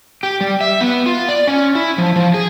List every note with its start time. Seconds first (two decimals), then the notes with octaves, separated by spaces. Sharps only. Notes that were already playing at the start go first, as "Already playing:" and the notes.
0.23 G4
0.41 G3
0.61 E5
0.81 B3
1.06 F4
1.29 D5
1.48 C#4
1.75 E4
1.98 F3
2.16 F3
2.34 G#4